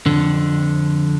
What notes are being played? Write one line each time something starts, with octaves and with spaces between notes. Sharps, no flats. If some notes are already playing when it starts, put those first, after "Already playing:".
F2 D3